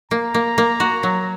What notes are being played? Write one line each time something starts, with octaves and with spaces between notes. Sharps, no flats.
A#3 A#5
A#3
A#3
F#4
F#3